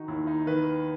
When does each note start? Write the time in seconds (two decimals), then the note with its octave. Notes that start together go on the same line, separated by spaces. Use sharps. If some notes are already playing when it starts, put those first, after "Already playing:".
Already playing: D#3 D#4 F#4
0.08 D#2 E4
0.27 D#4
0.47 D#3 B4